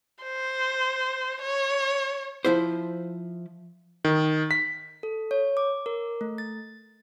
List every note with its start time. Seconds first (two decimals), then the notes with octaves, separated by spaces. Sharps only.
0.23 C5
1.41 C#5
2.45 F3 E4 C5
4.05 D#3
4.51 B6
5.03 A4
5.31 C#5
5.57 D6
5.86 A#4
6.21 A3
6.38 A6